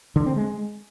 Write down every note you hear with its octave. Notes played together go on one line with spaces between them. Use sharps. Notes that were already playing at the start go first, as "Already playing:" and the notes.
D3
C4
G#3